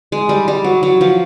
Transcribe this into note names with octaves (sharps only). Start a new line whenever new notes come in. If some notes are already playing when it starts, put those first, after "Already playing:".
G#3
G3
G3
F#3
F#3
F3